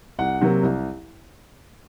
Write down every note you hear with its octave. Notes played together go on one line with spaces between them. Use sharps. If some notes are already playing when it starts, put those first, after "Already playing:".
C2 F#5
C3 F#3 A#3
C2